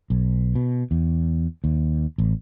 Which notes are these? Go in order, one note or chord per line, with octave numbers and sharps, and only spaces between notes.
B1
B2
E2
D#2
A1